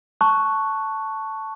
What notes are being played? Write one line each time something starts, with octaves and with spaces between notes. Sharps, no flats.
A5 C#6 F#6